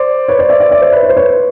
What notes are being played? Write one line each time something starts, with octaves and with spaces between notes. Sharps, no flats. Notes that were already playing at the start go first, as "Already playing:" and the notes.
Already playing: C5 D5
B4 C#5
C5 D5
D5 E5
D5 E5
D5 E5
C5 D5
B4 C#5
C#5
C5
B4 C#5